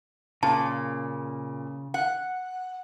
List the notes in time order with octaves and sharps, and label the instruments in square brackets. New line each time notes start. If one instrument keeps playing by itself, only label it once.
[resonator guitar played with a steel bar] A#2 [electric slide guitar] C#3 [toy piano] A5
[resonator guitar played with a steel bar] F#5